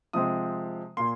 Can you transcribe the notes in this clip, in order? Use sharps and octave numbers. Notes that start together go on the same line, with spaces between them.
C3 F3 G#3 C4 D#6
A#2 A#3 C6